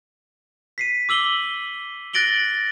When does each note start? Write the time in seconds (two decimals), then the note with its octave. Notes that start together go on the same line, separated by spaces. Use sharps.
0.78 B6 C7 D#7
1.09 D6 E6 F#7 G7
2.13 F#6 A6 A#6 D7 F#7 G7